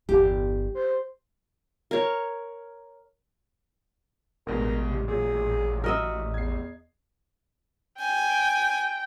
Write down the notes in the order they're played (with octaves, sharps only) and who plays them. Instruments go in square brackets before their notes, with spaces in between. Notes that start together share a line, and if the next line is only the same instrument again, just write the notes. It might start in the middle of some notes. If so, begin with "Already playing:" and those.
[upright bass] G1 E2 [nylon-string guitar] G4
[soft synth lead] C5
[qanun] A#4 C#5
[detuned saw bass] A1 [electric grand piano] D2 B2 G#3 [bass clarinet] A#4
[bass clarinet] C3
[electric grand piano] A#2 F#3 [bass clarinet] G#4
[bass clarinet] F#4 [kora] A#4 D#5 E5
[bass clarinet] E2 [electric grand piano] G#6 C7
[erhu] G5 [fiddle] G#5